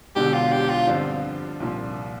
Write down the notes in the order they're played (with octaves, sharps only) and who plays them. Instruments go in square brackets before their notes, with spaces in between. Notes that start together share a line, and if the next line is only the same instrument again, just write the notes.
[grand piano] E1 E2 D3 [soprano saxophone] G4
[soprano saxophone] F4
G4
F4
[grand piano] G2 D3 F3 C4
C2 A#2 F3